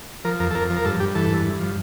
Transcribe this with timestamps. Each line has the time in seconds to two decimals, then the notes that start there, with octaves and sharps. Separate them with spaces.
0.25 F3 A#4
0.40 F2 A#4
0.51 A4
0.55 F2 A#4
0.70 F3
0.76 A#4
0.85 G2 A4
1.00 G2 G4
1.15 E3 A4
1.30 G2
1.45 G2
1.60 F3